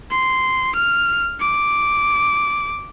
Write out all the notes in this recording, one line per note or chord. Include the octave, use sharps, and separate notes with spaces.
C6
F6
D6